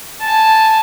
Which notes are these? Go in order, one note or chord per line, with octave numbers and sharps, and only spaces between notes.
G#5 A5